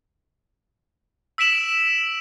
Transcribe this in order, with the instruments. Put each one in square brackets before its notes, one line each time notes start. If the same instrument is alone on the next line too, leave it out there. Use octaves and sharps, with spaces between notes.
[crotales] E6 B6 D7 E7 F#7